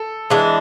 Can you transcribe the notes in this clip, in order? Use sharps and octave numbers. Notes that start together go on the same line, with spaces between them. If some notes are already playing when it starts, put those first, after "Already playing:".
Already playing: A4
E3 G#3 D4